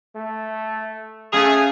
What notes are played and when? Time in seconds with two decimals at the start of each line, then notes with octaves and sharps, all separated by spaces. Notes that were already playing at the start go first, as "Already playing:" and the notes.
0.16 A3
1.33 A3 C#4 G#4 F5 A#5